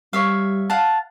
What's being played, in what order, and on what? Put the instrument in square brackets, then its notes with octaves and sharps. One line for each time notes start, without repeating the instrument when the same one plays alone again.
[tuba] G3 [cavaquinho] C#5 E5 F5
[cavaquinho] F5 F#5 A5